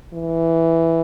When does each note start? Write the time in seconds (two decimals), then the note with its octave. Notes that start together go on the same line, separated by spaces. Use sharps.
0.13 E3